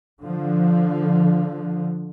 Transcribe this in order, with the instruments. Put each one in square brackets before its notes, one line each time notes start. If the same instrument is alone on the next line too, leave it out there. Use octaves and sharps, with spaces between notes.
[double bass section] D3 F3